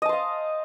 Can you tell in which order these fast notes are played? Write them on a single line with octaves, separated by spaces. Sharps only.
D#5 A5 C5 F5